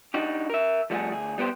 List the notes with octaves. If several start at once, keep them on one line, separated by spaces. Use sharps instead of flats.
D4 D#4 F#4 G4
A#4 E5
F3 G3 A3 D#4 F#4 G#4
D2 G#4
G3 B3 G4 C5